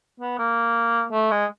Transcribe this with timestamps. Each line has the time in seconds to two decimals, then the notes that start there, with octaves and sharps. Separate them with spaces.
0.20 B3
0.39 A#3
1.12 A3
1.31 G#3